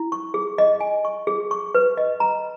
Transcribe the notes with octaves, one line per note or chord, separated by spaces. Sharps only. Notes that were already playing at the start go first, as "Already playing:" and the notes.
Already playing: E4
C#6
G#4
D#5
G#5
C#6
G#4
C#6
B4
D#5
A#5